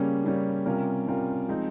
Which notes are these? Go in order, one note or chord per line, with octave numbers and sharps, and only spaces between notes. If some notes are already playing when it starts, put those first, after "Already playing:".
Already playing: C#3 G3 A#3 C#4
C#3 G3 A#3 C#4
C3 G3 C#4 F4 A#4
C3 G3 C#4 F4 A#4
F3 G#3 C4 D#4